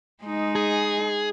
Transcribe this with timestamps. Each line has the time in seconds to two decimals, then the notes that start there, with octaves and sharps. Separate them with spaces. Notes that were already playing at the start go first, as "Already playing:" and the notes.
0.23 G#3 D#4
0.56 G#4